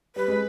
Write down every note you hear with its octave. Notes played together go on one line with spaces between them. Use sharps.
G3 B4
G#3